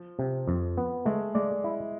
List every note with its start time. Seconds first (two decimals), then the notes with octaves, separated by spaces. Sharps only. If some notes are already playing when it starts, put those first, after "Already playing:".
Already playing: F3
0.19 C3
0.48 F2
0.77 B3
1.05 G#3 A3
1.35 G#3 D5
1.64 E4